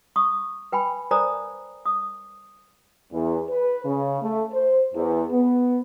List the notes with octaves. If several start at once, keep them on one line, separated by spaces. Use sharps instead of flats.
C#6 D#6
B4 G5 G#5 B5
A#4 C5 D5 G#5 A#5 D#6
D#6
E2
B4
C#3
A3
C5
E2
B3